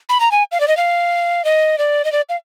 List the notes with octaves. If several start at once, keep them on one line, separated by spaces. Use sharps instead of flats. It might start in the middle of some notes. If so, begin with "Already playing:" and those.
B5
A#5
G#5
F5
D5
D#5
F5
D#5
D5
D#5
D5
F5